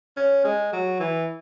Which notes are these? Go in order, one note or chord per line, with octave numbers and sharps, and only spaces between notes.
C#4
G#3
F#3
E3